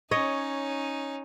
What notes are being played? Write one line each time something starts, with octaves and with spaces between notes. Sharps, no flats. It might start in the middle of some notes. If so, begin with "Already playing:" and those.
C#4 D#4 C#5 D#5